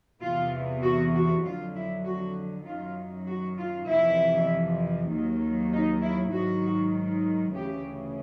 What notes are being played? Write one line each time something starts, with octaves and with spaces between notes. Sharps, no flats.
E2 C3 E3 F4
F#4
F#4
F2 D3 F#3 F4
E4
F#4
F#2 D#3 F#3 F4
F#4
F4
F2 C3 E3 E4
D#2 D#3 F#3
D#4
E4
G#2 D#3 F#3 F#4
D2 C#3 E3 G4